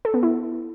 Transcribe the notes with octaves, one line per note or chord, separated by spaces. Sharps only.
A4
B3
E4